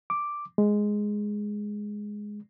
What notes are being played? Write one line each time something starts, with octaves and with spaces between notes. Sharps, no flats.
D6
G#3